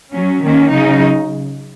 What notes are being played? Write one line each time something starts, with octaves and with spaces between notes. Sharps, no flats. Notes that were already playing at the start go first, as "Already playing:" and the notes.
F#3 C#4
D#3 A#3 C#4
C#3 F#3 D#4